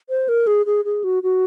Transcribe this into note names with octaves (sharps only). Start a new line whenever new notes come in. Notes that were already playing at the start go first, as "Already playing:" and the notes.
C5
A#4
G#4
G#4
G#4
F#4
F#4